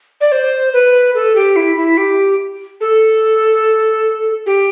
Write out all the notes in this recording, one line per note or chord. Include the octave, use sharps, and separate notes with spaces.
D5
C5
B4
A4
G4
E4
E4
G4
A4
G4